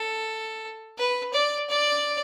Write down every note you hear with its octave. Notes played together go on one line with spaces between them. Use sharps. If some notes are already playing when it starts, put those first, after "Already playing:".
Already playing: A4
B4
D5
D5